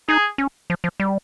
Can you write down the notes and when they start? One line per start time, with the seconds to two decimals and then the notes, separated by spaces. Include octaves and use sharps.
0.09 D#4 G#4
0.38 C#4
0.70 F3
0.84 F3
1.00 G3